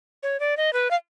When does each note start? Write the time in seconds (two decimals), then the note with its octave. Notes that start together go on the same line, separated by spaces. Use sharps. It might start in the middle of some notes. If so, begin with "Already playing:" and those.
0.23 C#5
0.40 D5
0.57 D#5
0.73 B4
0.91 F5